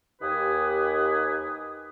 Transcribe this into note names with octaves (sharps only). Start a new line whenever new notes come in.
D#2 D#3 G4 B4 G#5 D#6